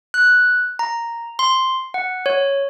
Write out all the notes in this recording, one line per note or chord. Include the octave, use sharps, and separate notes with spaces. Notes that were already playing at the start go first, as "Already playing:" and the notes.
F#6
A#5
C6
F#5
C#5